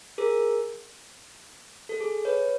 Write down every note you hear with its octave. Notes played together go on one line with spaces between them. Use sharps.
G#4 A#4
A4
G#4
B4 C#5